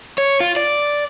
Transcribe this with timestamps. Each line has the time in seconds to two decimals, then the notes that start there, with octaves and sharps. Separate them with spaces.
0.18 C#5
0.40 F4
0.56 D5